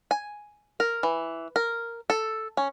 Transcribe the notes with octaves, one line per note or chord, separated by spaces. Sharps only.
G#5
A#4
E3
A#4
A4
C#4